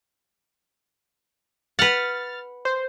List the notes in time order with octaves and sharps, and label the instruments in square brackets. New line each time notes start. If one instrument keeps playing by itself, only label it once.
[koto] B4 F#5 [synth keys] F6 A6
[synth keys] C5